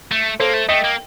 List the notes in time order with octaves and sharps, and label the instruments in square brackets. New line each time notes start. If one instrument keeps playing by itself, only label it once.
[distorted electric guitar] A3
[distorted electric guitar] A#3 [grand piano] A4 C5
[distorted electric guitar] A3
[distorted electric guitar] A3 [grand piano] D#5 G5
[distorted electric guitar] A#3